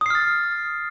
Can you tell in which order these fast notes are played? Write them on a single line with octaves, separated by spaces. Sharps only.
D#6 C7 F6 A6